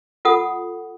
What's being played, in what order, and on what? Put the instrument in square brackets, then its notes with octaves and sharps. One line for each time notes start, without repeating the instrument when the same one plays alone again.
[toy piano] F4 A4 F#5 D#6